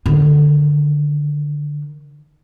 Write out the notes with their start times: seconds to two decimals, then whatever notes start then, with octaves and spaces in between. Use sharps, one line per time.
0.06 D3 D#3